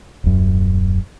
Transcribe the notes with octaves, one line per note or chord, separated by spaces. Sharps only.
D#1 F#2